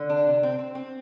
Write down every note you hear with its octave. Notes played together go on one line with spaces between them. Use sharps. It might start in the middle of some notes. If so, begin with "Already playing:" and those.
Already playing: D3
D4
C3
C4
C4
C4